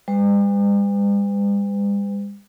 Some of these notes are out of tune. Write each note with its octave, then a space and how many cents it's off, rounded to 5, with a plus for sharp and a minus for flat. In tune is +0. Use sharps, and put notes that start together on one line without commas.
G3 +45 B4 +40